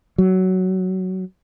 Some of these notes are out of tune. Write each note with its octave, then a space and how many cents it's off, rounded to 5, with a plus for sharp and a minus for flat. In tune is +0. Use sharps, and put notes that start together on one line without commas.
F#3 +10